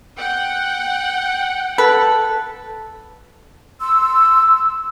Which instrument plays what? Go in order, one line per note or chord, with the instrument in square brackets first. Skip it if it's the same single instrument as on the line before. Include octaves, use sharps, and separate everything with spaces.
[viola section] F#5 G5
[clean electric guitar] A4 [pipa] B4
[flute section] C6 E6